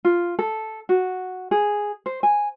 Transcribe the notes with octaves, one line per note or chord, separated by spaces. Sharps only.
F4
A4
F#4
G#4
C5
G#5